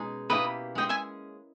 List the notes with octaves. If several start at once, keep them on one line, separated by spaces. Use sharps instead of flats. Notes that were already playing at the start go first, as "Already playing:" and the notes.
Already playing: B2 G#3 C#4 D#4 G#4
B2 A#3 E4 G4 B4 D#5
G#3 C#4 G#4 D#5 G5
E5 G#5